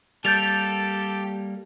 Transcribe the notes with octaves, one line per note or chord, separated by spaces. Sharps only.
G3 A#3 G4 A4 G5 G6 A6 F7